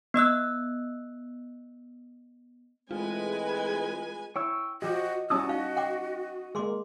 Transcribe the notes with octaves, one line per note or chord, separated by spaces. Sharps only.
B3 D#5 E6 F#6
E3 G#3 A3 C4 F4 B4 G#5
E4 C#5 G5 C#6 E6
F3 F#4 G4 D#5
G3 C#4 E4 F#4 A5 D#6 E6
D#4 D#5 F5
F#5 G5 D6
G#3 A#3 G#4 C6 D6